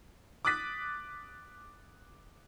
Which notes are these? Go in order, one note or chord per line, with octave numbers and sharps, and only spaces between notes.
D6 D#6 F#6 A6 B6